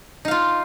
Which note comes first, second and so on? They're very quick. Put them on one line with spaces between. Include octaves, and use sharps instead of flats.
D#4 F5 F4